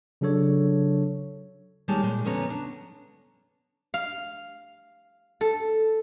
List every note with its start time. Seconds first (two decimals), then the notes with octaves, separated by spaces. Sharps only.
0.21 C#3 F#3 D4 A4 C#5
1.88 D#2 G3 G#3 G4 C#5 A5
2.03 A#2 G#3
2.24 F2 D3 B3 C#4 A#5
2.50 D4
3.94 F5
5.41 A4